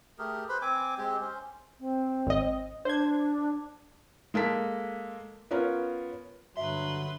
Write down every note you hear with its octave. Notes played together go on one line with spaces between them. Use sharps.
A3 G4 G#4 A#4
B4 C5 B5
C4 G#5 D6
G#3 C4 G4
C#4 C5
C4
G#1 D#5
D4 C5 G#6
G#3 A#3 A4 B6
B3 C#4 F4 A#4
G2 D3 F#3 B4 E5 C6